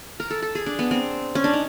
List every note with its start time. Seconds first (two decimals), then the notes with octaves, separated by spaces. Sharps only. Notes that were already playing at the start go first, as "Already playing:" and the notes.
0.20 A#4
0.30 A4
0.42 A4
0.55 G#4
0.66 D4
0.79 B3
0.91 C4
1.35 C#4
1.44 D4
1.54 D#4